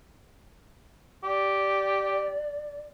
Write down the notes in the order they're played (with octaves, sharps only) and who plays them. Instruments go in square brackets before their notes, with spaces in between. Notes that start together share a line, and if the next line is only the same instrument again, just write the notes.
[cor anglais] G4 [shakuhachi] D5